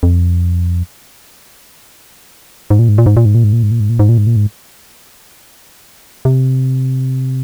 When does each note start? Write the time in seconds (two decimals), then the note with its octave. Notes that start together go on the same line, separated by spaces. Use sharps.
0.03 F2
2.70 G#2
2.79 A#2
2.89 G#2
2.98 A#2
3.06 G#2
3.17 A#2
3.25 G#2
3.35 A#2
3.44 G#2
3.53 A#2
3.63 G#2
3.71 A#2
3.80 G#2
3.89 A#2
3.99 G#2
4.09 A#2
4.18 G#2
4.27 A#2
4.36 G#2
6.25 C3